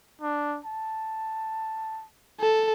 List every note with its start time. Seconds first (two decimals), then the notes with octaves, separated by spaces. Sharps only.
0.21 D4
0.65 A5
2.40 A4